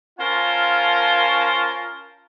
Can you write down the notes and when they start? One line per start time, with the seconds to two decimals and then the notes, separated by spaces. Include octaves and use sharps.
0.20 C#4 F4 A#4 C5 F5 A5